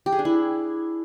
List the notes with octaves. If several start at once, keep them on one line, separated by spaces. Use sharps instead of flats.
G4
G#4
D4
E4